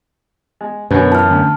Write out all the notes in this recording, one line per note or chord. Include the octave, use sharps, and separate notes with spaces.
G#3
F#2 B2 D3 B4 C#5
E3 A5 F6
D2